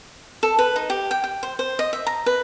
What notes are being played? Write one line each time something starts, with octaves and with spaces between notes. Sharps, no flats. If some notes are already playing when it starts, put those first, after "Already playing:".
A4
B4
D#4
G4
G5
G5
C5
C5
D#5
E5
A#5
B4